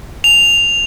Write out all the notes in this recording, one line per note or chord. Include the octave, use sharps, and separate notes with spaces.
F7